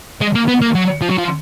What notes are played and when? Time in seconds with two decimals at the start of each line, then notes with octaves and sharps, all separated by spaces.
0.21 G#3
0.35 A#3
0.48 B3
0.61 A#3
0.75 F#3
1.02 F3
1.10 F#3
1.18 F3